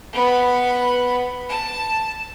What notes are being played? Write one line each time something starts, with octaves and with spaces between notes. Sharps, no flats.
B3 B5
A5